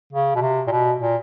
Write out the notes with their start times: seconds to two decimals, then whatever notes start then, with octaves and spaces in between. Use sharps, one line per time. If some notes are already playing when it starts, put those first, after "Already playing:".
0.13 C#3
0.35 B2
0.42 C3
0.67 A#2
0.71 B2
1.01 A#2